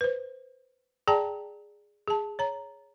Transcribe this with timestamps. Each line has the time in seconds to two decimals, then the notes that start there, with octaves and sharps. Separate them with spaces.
0.01 B4 C5
1.08 G#4 D5 G5 A5 A#5
2.08 G#4 A5
2.39 C#5 A#5